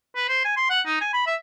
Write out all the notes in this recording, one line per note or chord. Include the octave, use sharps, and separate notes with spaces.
B4
C5
G#5
C6
F#5
D#4
G#5
B5
E5